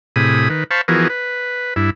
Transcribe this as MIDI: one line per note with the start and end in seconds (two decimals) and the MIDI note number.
0.16 0.49 45
0.16 0.49 48
0.16 0.49 68
0.16 0.49 83
0.16 0.49 87
0.50 0.64 51
0.50 0.64 71
0.71 0.81 72
0.71 0.81 77
0.71 0.81 81
0.71 0.81 83
0.71 0.81 85
0.88 1.08 52
0.88 1.08 53
0.88 1.08 59
0.88 1.08 66
0.88 1.08 68
0.88 1.08 70
1.10 1.74 71
1.76 1.90 43
1.76 1.90 64